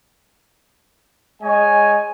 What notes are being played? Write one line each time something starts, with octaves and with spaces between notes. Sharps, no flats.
G#3 C#5 D#5 G#5